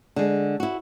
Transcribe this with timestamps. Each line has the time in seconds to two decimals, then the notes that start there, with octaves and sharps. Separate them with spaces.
0.16 D3 G#3
0.60 E4 F#4